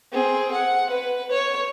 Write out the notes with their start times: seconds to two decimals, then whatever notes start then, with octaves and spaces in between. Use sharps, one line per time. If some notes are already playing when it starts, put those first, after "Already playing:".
0.12 C4 G#4
0.52 F#5
0.90 B4
1.31 C#5